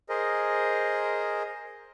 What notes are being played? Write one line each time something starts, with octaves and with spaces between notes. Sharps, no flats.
G#4 A#4 C5 D#5